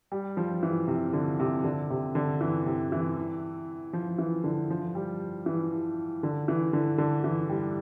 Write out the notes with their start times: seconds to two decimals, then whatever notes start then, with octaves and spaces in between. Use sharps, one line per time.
0.12 G3
0.37 F3
0.63 E3
0.88 C3
1.13 D3
1.39 C3
1.64 D3
1.90 C3
2.15 D3
2.41 E3
2.66 C3
2.92 E3
3.93 F3
4.19 E3
4.44 D3
4.70 F3
4.95 G3
5.46 E3
6.23 D3
6.48 E3
6.73 D3
6.98 D3
7.24 E3
7.49 G3